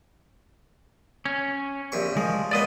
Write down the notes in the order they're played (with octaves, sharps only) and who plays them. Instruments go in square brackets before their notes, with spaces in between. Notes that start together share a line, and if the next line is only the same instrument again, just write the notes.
[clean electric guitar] C#4
[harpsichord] A#1 C3 C#6
[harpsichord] F3 [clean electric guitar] G#3
[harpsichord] C#2 A#2 B3 [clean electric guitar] D5 D#5